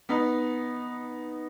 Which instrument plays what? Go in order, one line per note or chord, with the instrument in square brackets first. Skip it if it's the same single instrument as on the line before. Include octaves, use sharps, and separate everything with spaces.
[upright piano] B3 D#4